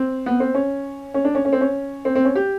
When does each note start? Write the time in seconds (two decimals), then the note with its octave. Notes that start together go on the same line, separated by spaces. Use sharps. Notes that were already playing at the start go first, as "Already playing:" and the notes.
Already playing: C4
0.26 B3
0.40 C4
0.54 C#4
1.14 C#4
1.25 D4
1.35 C#4
1.45 C#4
1.53 C4
1.61 C#4
2.05 C4
2.15 C4
2.25 C#4
2.35 G4